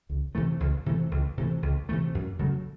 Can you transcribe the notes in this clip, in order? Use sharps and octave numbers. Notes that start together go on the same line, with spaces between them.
C#2
C3 E3 A3
C#2
C3 E3 A3
C#2
C3 E3 A3
C#2
C3 E3 A3
F#2
C#3 F#3 A3